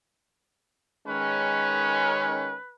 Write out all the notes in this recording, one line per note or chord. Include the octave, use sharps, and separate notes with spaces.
D#3 G#3 C#4 B4